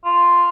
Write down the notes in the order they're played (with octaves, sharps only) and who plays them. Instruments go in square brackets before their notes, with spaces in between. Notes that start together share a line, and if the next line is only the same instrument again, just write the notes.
[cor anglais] F4